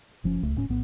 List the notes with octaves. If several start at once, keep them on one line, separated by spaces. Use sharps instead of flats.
F#1 F3 C#4
D1 C#2 A3
D#1 A2 C#4
A#1 A2 B3